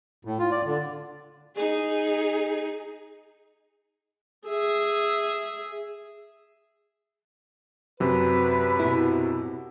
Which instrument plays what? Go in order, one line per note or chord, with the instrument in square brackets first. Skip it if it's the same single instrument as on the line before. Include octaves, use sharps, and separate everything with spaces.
[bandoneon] A2
F4
D5
D3
[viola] D#4 G#4
G#4 E5
[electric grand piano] F#2 C3 F#3 [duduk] B4
[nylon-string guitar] B2 E4